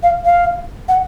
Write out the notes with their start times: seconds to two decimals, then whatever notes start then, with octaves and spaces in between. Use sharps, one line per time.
0.02 F5
0.24 F5
0.88 F#5